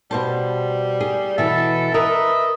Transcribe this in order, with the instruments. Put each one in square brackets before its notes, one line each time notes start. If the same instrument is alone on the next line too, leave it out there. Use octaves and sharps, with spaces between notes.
[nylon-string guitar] B2 C5 A5 [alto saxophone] G3
[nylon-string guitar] G#4
[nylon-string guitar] B2 E3 [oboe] A4 [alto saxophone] E5
[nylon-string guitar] A#4 B4 [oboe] D#5 [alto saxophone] E5